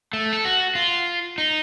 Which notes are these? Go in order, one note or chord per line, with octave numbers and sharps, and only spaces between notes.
A3
A4
F#4
F4
D#4